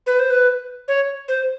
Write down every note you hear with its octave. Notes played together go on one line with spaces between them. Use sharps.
B4
C5
B4
C#5
C5